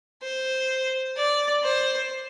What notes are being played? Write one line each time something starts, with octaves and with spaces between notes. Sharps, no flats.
C5
D5
C5